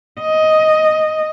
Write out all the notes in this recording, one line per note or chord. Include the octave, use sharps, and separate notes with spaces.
D#5